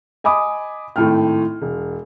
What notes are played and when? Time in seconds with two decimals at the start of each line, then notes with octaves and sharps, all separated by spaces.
0.24 D#5 G#5 B5 D6 D#6
0.96 G#1 A2 A3 G5 F6
1.62 E1